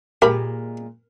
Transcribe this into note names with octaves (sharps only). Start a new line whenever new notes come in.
A#2 G#3 G4 A#4 B5